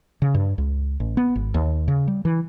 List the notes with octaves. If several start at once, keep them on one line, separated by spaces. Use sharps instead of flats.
C#3
G2
C#2
A1
B3
G#1
D#2
C#3
G3
E3